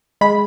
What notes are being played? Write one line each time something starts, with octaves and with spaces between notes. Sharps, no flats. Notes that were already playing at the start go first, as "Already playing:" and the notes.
G#3 B5